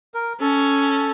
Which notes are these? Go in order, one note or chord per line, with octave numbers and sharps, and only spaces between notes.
A#4
C#4 A4